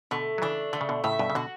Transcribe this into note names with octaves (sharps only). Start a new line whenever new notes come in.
B2 D3 A3
F#3
C#3 E3 D4
D3 A3
C#3
B2 D3
A2 C#3 E5
G2 B2
C#3
B2 D3 F#4